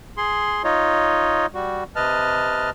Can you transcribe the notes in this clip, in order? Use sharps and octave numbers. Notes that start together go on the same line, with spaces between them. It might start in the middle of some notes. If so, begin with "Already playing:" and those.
G#4 C6
D#4 F4 C#5 D#5
G3 F#4
C3 B4 D#5 A5 F6